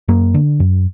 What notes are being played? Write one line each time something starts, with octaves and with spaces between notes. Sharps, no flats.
F#2 A#3
D3
F#2